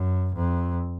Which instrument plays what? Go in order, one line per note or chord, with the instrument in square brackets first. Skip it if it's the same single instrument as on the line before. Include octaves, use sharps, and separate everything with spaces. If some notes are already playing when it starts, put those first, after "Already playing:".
Already playing: [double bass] F#2
F2